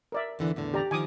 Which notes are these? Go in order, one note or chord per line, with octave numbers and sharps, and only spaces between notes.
A#4 D5 E5
E2 D3 E3
E2 A2 D3
G4 D5 A#5
D#3 F3 G#5 D6 D#6